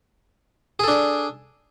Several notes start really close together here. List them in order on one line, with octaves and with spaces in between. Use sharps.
G#4 A4 D4